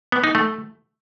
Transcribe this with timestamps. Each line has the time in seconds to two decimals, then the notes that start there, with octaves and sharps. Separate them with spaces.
0.12 B3
0.24 D#4
0.35 A3